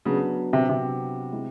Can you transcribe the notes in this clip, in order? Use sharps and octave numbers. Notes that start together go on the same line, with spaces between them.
C#3 F#3 B3 D4
C3
C3
G#3 C4 E4 G#4